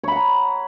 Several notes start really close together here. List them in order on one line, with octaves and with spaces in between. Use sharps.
C#5 B5 F#5 A#5